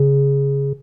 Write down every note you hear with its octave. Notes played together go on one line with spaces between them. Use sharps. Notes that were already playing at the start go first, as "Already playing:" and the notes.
Already playing: C#3